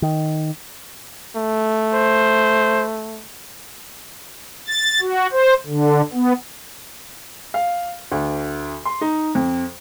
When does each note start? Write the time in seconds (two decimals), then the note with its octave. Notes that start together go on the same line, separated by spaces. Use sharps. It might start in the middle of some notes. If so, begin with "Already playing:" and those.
0.02 D#3
1.36 A3
1.94 C5
4.67 A6
5.01 F#4
5.32 C5
5.66 D3
6.13 B3
7.54 F5
8.11 D2
8.86 C6
9.01 D#4
9.35 F2